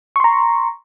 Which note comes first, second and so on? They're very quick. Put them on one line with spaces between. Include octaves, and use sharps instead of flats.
C#6 C6 A#5